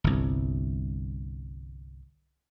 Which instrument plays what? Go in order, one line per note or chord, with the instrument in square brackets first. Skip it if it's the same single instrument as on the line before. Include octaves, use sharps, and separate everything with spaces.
[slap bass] G1 C2